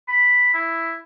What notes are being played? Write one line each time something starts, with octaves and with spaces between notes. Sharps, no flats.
B5
E4